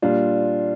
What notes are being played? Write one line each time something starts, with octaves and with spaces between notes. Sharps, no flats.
A#2 G3 D4 F4